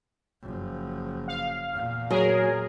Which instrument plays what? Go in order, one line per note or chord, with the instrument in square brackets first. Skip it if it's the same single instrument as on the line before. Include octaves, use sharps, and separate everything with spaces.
[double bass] F#1 F3
[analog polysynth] F5
[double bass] E2 A#2
[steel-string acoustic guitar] F#3 [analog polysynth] G#4 A#4